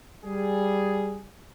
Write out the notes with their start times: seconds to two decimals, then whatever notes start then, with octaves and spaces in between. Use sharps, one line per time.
0.25 G3 G#4